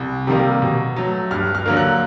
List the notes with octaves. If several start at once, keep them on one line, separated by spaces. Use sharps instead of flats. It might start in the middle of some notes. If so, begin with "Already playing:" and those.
Already playing: C2
C3 D#3 G3 A#3
B2
F#3 A3
G2 F6
F6
D3 F#3 A#3
F#6